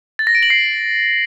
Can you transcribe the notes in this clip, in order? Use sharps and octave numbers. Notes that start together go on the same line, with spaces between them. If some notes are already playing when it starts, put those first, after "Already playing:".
A6
A#6
D7
F#7
C7